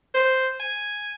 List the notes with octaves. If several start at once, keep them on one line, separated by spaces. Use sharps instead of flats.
C5
G#5